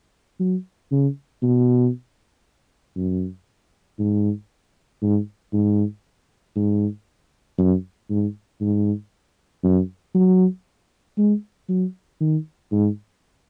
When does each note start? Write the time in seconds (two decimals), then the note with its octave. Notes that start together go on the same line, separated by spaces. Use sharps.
0.40 F#3
0.91 C#3
1.42 B2
2.96 F#2
3.99 G#2
5.02 G#2
5.53 G#2
6.56 G#2
7.58 F#2
8.10 G#2
8.61 G#2
9.64 F#2
10.15 F#3
11.18 G#3
11.69 F#3
12.21 D#3
12.72 G#2